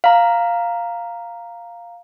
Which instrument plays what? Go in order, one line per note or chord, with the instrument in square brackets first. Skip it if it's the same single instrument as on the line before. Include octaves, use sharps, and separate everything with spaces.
[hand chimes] F5 A#5